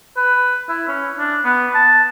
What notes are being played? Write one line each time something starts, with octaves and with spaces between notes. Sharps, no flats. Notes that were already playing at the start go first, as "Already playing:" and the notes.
B4
E4
C#4
D4
B3
A5